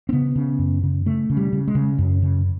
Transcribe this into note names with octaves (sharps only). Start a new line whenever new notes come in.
C4
C#3 B3
C#3
F#2
C#3
C#3 A3
C#3
G3
C#3
G#3
C#3
F#2
C#3